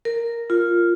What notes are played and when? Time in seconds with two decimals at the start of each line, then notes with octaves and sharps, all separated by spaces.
0.05 A#4
0.50 F4